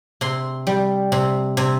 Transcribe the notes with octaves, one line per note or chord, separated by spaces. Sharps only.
C3 C6
G3
C3
C3